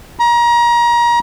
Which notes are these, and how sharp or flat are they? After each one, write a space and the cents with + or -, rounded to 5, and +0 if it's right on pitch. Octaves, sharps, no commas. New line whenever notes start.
A#5 +30